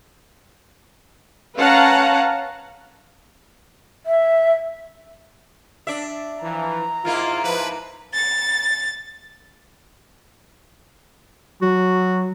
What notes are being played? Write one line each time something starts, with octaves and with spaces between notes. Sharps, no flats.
C#4 B4 F5 F#5 A5 A#5
E5
D4 E5
E3 F3 A#5
G#2 A#3 E4 F4
F3 B4
A6
F#3 F#4